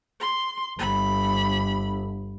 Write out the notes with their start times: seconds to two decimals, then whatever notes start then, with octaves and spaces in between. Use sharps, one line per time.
0.20 C6
0.79 G1 B5